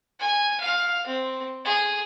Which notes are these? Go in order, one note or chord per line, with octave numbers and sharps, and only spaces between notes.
G#5
F5
C4
G#4